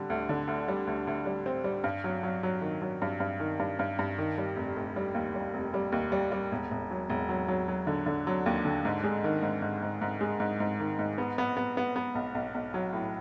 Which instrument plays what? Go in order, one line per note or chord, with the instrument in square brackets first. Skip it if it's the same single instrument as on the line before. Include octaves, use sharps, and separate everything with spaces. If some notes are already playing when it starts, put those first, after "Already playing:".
Already playing: [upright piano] D3 G3
D2
D3
D2
G3
D2
D2
G3
C4
G3
G2
F#3
F#3
F#3
D#3
F#3
G2
G2
D#3
G2
G2
G2
D#3
G3
F1
F1
G3
D#2
G3
F1
G3
D#2
G3
G3
E1
E1
F#3
E1
F#3
F#3
F#3
D3
D3
F#3
D#2
D3
G#2
G#3
D#3
G#2
G#2
G#2
G#2
G#3
G#2
G#2
D#3
G#2
B3
B3
B3
B3
B3
B1
B1
B1
F#3
A2